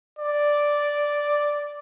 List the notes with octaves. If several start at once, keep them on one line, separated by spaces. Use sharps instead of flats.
D5